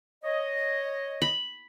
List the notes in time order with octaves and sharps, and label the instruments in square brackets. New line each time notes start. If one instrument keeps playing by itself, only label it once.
[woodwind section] C#5 D#5
[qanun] B5